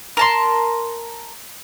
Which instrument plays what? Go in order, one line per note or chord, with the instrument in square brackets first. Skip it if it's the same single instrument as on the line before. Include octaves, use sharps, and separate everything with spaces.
[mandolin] A#4 A5 C6